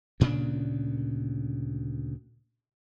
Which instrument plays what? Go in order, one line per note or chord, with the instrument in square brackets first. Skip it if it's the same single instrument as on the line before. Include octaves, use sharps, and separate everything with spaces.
[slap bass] D2 A#2 C#3 D4